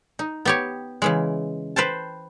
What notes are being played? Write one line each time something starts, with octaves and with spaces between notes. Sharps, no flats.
D#4
B3 G4 C#5
C#3 E3 G#3
B4 C5 G5 A5